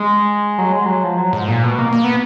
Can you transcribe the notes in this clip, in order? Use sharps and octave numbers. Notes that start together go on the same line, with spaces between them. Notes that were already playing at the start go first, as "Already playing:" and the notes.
Already playing: G#3
F#3
G#3
F#3
F3
F#3
G#2
A#2
B2
A#3
A#3
B3